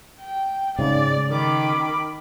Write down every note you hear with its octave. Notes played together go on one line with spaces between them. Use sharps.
G5
G#2 C#3 D5
D#3 B5 D6